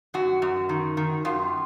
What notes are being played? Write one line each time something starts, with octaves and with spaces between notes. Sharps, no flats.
F#2 F#4
F#2
D#3
D#3
F#2 F4